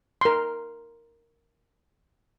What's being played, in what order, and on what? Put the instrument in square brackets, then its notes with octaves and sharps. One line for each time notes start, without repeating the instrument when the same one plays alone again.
[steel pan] A#4 C6